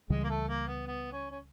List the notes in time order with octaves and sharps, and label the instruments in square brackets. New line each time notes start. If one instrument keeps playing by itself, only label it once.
[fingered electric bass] C#2 C#3 E3 G3 [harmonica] G#3
[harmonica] A#3
A3
A#3
B3
B3
C#4
C#4